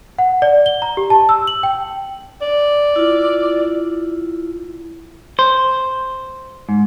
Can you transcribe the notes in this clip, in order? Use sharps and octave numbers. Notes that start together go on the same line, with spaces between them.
F#5
D5
G7
A#5
G4
A5
E6
F#7
G5
D5
E4 F4
C5
G#2